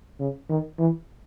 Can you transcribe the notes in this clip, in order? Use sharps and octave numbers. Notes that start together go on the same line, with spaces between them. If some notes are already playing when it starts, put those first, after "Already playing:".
C#3
D#3
E3